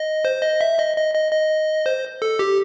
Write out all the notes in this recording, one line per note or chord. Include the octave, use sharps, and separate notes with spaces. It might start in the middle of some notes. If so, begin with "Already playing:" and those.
Already playing: D#5
C5
D#5
E5
D#5
D#5
D#5
D#5
C5
A4
G4